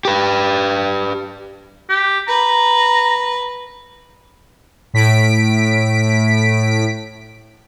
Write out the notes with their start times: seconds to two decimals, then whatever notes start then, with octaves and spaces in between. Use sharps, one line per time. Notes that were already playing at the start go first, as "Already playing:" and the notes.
0.05 G4 B4
1.89 G4
2.28 B4 A#5
4.94 A2 B6 D7